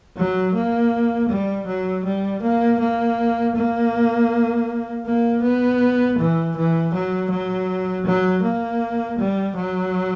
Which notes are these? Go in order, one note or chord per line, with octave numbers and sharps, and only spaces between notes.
F#3
A#3
G3
F#3
G3
A#3
A#3
A#3
A#3
B3
E3
E3
F#3
F#3
F#3
A#3
G3
F#3